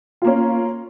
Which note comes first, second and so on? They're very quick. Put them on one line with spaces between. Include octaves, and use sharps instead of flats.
F4 A#3 C#4